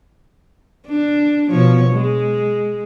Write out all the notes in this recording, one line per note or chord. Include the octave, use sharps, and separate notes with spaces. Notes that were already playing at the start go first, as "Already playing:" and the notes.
D4
B2 F3 C#5
G#3